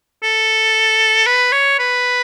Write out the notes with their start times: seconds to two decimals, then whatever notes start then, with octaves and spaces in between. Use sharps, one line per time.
0.23 A4
1.26 B4
1.52 C#5
1.79 B4